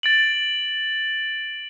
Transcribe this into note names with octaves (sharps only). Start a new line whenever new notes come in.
A6 D7 F#7